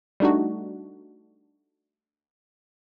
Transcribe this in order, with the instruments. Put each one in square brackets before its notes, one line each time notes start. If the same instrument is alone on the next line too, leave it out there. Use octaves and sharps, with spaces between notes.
[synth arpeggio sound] G3 A3 D4 D#4 F#4